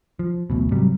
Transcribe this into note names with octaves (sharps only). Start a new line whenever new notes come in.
F3
D1 A1 B2
G#2 C3 F#3 G3